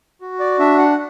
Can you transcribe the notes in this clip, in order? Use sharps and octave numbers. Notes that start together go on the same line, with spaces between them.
F#4
D5
D4 E5
F#5